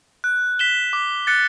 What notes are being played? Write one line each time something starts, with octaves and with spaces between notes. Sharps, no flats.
F#6
B6 E7 G7
D6
F#6 A6 C#7